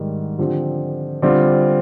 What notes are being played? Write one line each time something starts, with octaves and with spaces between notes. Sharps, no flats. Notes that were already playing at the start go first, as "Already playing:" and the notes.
Already playing: G#2 D#3 G3
D3 F3 C4 G4
D3 G3 C4 F4